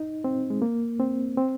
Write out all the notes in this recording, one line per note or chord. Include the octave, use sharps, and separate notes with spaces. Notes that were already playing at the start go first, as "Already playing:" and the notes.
Already playing: D#4
C4
G#3
A#3
C4
C4